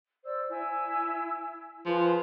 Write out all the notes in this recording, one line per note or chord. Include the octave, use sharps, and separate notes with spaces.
C5 D5 E6
E4 G#5 E6
F3 G#4 B4 C6